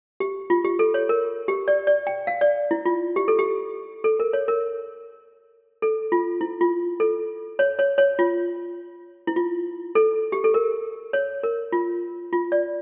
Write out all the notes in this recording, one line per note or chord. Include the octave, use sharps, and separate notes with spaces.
G4
F4
G4
A4
C#5
A#4
G4
D5
D5
G5
F5
D5
E4
F4
G4
A4
G4
A4
A#4
C#5
A#4
A4
F4
E4
F4
A4
C#5
C#5
C#5
F4
E4
F4
A4
G4
A4
A#4
C#5
A#4
F4
F4
D5